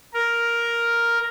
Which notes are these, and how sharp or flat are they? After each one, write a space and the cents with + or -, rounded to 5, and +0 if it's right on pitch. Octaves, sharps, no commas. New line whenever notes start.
A#4 +5